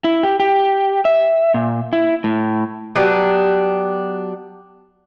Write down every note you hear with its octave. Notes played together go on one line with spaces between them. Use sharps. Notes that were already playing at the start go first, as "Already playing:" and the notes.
E4
G4
G4
E5
A#2
E4
A2
F#3 B3 D4 G4